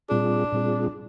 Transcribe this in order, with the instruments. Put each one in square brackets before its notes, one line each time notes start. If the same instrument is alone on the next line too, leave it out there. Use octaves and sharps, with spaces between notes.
[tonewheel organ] A#2 G3 C4 F4 G#4 [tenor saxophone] D4
[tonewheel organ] A#2 G3 C4 F4 G#4